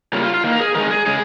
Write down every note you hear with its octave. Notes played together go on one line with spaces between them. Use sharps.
C#3 G3 A#3 F4
F4
F4
D#3 A#3
A#4
G#4
D#3 G#3 A#4
G#4
C#3 G#3 G#4